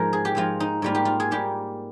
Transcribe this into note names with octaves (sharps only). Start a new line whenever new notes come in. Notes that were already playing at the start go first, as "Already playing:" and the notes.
Already playing: G#2 F3 G#3 A#4
G#4
G4
G#2 F3 G#3 F4
D#4
G#2 G3 A#3 F4
G4
F4
G#4
G#2 G3 A#3 G4